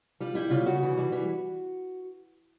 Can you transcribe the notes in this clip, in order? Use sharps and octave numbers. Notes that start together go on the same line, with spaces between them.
G3 F4
G3 E4
C#3 F4
C#3 F#4
E3
G3
E3